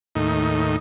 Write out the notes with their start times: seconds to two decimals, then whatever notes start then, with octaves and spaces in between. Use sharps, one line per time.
0.16 D#2 A2 D#4